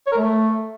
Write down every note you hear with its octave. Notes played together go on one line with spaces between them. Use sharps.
C#5
A#4
A3